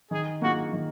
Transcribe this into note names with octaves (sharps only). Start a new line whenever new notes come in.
D#3 G#4
A#3 F4 F#4 G#4
D#3